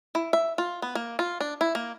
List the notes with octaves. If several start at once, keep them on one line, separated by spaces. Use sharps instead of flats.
E4
E5
F4
B3
A#3
F4
D4
E4
A#3